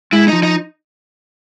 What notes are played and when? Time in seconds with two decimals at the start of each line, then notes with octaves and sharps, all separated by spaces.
0.12 G#3 E4
0.28 F3 D#4
0.43 D#4